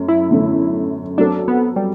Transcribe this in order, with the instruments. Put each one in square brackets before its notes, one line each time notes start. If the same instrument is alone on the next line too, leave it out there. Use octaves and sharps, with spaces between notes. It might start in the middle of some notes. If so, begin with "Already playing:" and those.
Already playing: [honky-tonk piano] F#2 A3
[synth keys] E4
[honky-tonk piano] F#2 D3 A3
[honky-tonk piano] F#3 C4 F#4 A4 [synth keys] D4
[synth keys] B3
G3